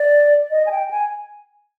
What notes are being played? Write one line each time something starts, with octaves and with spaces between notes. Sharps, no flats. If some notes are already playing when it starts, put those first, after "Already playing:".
Already playing: D5
D#5
G#5
G5
G#5